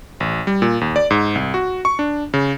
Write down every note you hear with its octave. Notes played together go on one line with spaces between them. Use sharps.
A1
G3
A#2
D#2
D5
G#2
C2
F#4
C#6
D4
C#3